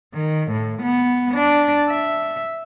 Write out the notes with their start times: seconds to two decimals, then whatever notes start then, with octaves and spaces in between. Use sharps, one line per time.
0.14 D#3
0.52 A2
0.83 B3
1.35 D4
1.90 E5